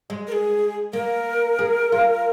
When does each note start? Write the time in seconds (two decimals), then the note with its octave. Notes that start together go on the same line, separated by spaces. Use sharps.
0.10 G#3
0.27 A#4
0.32 G#4
0.93 A#3 A#4
1.59 G#4
1.92 F4